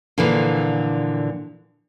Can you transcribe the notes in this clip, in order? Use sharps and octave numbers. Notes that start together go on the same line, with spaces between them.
A#2 D3 E3 F3